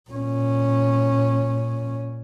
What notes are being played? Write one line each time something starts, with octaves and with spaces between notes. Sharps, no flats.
A#2 C#4